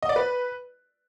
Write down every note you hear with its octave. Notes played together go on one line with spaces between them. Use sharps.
D#5
D5
B4